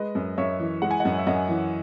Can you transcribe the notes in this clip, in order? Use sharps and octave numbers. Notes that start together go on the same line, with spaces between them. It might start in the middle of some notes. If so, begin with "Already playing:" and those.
Already playing: G#3 B4 D#5
F#2
F#2 C#5 E5
E3
G#3 F#5
G#5
D#5 F#5
F#2
E5
F#2 D#5 F#5
E3